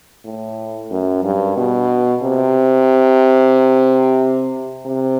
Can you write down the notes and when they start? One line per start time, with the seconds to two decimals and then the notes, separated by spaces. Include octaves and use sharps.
0.25 A2
0.91 F#2
1.24 G2
1.57 B2
2.23 C3
4.86 C3